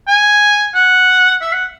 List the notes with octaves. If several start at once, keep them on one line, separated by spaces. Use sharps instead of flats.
G#5
F#5
E5
F#5